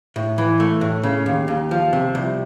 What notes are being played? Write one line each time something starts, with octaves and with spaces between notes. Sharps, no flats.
A2
E3
A3
A2
C#3
D#2
D#2
F3
C3
C2